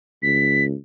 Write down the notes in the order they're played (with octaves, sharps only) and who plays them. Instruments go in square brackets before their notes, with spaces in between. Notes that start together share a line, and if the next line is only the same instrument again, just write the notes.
[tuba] C#2 [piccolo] B6